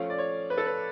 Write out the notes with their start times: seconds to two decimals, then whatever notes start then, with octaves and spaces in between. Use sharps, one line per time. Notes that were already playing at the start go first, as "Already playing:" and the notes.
Already playing: F3 A3 C#4 F5
0.10 D5
0.18 C#5
0.50 B4
0.58 A4
0.66 B4